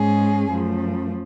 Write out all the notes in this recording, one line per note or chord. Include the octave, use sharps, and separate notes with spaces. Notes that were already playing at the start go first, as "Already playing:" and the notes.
Already playing: G#2 G#3 C#4 G#4
F#2 F3 A3